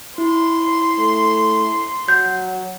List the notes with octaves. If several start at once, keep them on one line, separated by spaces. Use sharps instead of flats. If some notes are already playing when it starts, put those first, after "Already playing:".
E4 C6
A3
F#3 G6